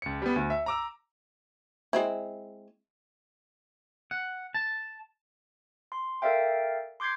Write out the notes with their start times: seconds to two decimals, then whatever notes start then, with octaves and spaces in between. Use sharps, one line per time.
0.02 C#2 C#7
0.22 G3 B3
0.36 D2
0.50 E5
0.66 A#5 D6 E6
1.93 G#3 C4 E4
4.11 F#5
4.54 A5
5.92 C6
6.22 A4 A#4 D5 E5 F5 G5
7.00 C6 D6 G6 G#6 C7